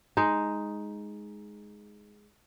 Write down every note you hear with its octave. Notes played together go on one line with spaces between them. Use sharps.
G#3 D#4